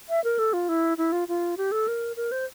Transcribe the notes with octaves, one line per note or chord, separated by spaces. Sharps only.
E5
A#4
A4
F4
E4
E4
F4
F4
G4
A4
A#4
A#4
C5